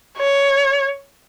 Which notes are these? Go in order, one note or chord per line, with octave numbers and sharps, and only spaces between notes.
C#5